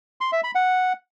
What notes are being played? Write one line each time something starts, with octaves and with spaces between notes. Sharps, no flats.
C6
E5
B5
F#5